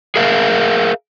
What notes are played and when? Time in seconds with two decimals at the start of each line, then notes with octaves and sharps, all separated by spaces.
0.16 G#4 A#4 E5 F5